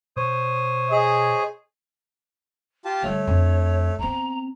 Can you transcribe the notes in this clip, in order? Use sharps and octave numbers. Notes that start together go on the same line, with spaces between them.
B2 C5 C#5 D#6
G#4 D#5
F4 G4 A5
D3 G3 A3 C#5
F2 D4
B3 C4 A#5